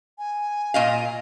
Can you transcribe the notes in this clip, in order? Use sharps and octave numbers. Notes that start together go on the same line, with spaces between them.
G#5
A#2 D#5 F5